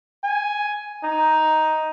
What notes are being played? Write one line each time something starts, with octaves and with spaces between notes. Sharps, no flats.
G#5
D#4